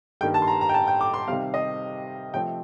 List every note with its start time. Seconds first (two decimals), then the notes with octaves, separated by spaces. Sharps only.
0.21 G2 D#3 G3 A#3 G5
0.34 A5
0.42 C6
0.47 A#5
0.61 A#5
0.69 G5
0.74 A5
0.87 G5
1.01 D6
1.14 C6
1.27 C3 D#3 G3 C4 F5
1.54 D#5
2.34 C3 F3 A3 C4 G5